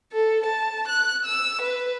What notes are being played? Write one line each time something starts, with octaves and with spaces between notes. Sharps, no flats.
A4
A5
F#6
E6
B4